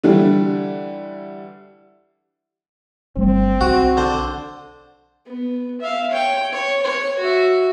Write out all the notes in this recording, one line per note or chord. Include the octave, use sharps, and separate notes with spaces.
D3 E3 G3 A3 D4
G1 G3 A3 C4
B1 F#4
D3 C5
B3
E5 F5
C#5 G5
C#5
C#5
F#4 E5